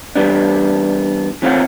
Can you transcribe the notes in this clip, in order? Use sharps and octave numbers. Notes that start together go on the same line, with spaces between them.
E3 G3 B3 D4
E3 C4 F4 C#5 F#5